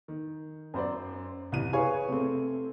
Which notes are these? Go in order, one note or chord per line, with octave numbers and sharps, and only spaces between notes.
D#3
F#2 C5 D5
C2 E3 D#7
G#4 B4 C#5 F5 G#5
C3 A3 C4